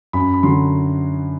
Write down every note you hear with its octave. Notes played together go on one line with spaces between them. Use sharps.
F#2 B5
B5
D3 F#3 C6